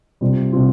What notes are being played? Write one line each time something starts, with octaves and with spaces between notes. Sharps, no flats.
C3 G3 C4 F4
C3 G3 C4 F4